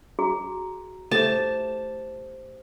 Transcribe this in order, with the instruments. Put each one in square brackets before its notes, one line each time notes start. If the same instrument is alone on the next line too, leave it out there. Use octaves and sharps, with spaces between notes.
[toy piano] F#4 G#4 A#5
[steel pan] A3 [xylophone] G4 C5 [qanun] A5